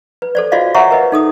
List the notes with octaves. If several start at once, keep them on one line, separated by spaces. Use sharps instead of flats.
B4
A4 C5 D5
F4 F#4 C5 D5 D#5 F5
C5 C#5 E5 F#5 A#5 C#6
A#4 B4 D#5
D#4 A4 D#6